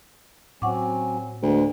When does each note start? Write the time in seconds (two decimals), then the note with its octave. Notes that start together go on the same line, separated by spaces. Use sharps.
0.62 A2 F#3 C4 C#4 F#5 C#6 D6
1.42 D2 G#3 B3